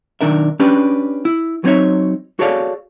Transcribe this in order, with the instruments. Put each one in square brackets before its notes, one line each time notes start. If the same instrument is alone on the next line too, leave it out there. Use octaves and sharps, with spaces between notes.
[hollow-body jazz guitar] B1 G2 D#3 D4 A#4 E5
C#4 D4 G4 B4
E4
F#3 B3 C4 D#4 C#5 E5
F#4 G#4 A4 C#5 D5 F5